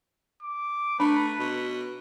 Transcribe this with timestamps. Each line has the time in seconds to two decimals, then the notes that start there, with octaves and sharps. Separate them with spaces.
0.42 D6
1.00 A3 D4 B4 B5
1.39 B2